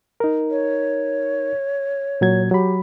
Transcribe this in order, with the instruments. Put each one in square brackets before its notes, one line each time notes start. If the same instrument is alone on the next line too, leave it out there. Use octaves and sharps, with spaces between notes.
[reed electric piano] D#4 A#4
[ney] C#5
[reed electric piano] A#2 F#3 G#6
[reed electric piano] F#3 B5 [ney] G4